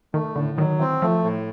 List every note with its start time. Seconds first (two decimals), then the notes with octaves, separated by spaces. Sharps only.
0.14 D#3 A3
0.36 A2 D3
0.58 D#3 F#3
0.79 E3 C4
1.02 F3 A3
1.24 A2